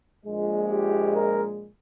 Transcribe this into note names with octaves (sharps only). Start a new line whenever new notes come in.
A#1 A#2 G#3
G4
A#4